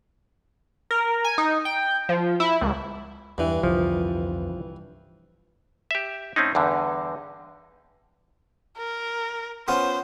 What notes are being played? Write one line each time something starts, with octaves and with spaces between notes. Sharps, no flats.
A#4
G#5
D#4
G5
F3
E4
C#2
E2 G2 E3
C2 F2 D3 F3
G4 E5
A2 C4 C#4 D#4
E2 G2 D3
A#4
B3 C#4 F4 C5